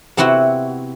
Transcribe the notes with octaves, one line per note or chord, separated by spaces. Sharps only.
C3 B3 C4 E4 F#4